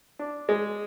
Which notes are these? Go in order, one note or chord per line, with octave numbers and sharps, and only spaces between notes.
D4
G#3